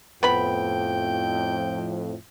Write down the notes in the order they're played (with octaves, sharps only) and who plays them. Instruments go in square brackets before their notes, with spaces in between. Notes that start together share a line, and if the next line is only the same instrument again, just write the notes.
[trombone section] F2 A2 [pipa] B3 B5 [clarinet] G5